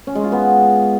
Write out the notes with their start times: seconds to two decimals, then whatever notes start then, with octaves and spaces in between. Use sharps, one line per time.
0.07 C#4
0.15 G#3
0.24 F4
0.32 B3